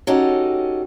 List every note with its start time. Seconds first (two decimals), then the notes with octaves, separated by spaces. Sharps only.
0.07 C#4 D#4 F#4 G4 A4